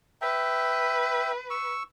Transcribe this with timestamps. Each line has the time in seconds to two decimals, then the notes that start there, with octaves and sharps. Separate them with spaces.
0.22 B4 E5 G5
1.50 C#6 E6